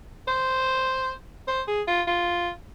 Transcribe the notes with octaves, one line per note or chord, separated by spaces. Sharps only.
C5
C5
G#4
F4
F4